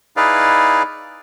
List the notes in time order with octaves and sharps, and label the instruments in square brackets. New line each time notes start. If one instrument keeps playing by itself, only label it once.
[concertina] D#4 E4 G#4 B4 D5 F5